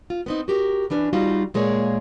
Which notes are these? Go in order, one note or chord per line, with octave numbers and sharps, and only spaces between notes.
F4
B3 C4 D#4
F#4 G4 A#4
E3 C#4 D4 B4
G3 D#4 F4 F#4
A#2 G#3 A#3 G#4 C#5